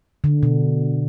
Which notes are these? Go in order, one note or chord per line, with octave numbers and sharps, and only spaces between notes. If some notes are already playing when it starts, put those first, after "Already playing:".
D3
B2